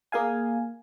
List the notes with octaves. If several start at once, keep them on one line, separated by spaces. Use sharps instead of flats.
A#3 G#4 F5 G#5